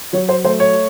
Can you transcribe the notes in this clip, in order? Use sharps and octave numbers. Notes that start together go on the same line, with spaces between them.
F#3 C#5
C5
A3 C5
C#5